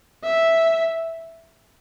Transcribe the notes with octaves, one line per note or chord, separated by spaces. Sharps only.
E5